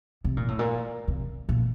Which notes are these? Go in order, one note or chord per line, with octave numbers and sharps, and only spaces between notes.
C3
A#2
A2
A#2
C3
A#2